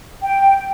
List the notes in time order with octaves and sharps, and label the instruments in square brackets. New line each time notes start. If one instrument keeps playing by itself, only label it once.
[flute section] G5